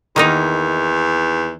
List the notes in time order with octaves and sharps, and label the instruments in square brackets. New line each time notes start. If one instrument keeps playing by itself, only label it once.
[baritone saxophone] E2 [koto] D#3 A#3 D#4